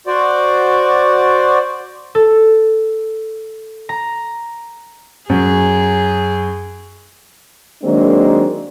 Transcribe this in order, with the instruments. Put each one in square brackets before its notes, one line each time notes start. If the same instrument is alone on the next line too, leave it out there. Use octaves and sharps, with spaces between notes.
[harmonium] F#4 C5 D5
[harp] A4
A#5
[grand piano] F#2 [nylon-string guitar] C#4 [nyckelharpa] G#4
[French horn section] D#3 F#3 G#3 A#3 C4 D4